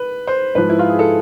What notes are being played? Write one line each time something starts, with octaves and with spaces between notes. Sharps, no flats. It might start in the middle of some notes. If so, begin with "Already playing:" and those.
Already playing: B4
C5
G#2 F3 G#3 B4
E4
F4
G#4
A4